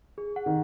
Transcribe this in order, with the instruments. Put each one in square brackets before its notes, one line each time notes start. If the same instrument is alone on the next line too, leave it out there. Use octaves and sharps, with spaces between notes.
[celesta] G#4
F#5
[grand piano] D#3